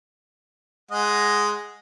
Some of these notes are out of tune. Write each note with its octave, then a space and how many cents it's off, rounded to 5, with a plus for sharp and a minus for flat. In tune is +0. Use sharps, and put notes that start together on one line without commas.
G#3 +0 D#5 +0 F#5 +0